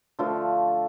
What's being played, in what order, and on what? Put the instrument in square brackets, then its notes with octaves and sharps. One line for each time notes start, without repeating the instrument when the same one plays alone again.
[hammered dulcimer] D3 F3 A3 F4